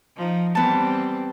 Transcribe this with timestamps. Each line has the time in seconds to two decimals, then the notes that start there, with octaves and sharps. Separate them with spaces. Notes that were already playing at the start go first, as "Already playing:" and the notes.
0.16 F3 D#4
0.55 E3 G3 B3 C4 A5